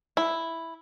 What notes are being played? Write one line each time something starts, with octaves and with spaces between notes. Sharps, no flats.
E4